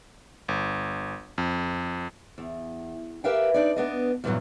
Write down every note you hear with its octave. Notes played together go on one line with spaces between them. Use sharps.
G1
F2
E2
G4 A#4 B4 E5 F5 G5
D4 D#4 D5
B3 D4 D#5
E2 G2 A#2 D#3 E3 F#3